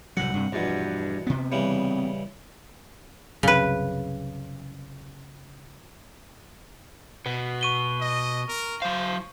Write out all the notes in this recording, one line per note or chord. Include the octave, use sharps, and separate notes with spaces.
C2 A2 F#3 F#5
G2 C3
A#1 E2 G2 B2
C3 B3
C#3 E3 G3
C2 F#2 C#3 B4
B2 B3
C#6 D#7 G7
D#5
A#4
F#3 C5 F5